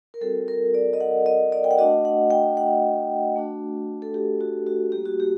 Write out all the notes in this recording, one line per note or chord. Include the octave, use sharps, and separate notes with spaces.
A#4
G3 C4 F#4 A4
A#4
D5
D#5
F#5
D#5
D5
G5
F#5
A3 D4 F#4 D#5
F#5
G5
F#5
A3 D4 F#4
A4
G4
F#4
F#4
G3 A#3 F#4 G4
F#4
G4